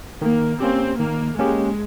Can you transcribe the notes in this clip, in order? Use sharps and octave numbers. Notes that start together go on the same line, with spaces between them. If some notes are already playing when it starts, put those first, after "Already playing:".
D#3 A#3
A#3 C4 C#4 G4
D#3 A#3
G#3 A#3 C#4 G4